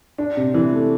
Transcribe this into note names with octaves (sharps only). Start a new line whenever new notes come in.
D4
C3
E3
A3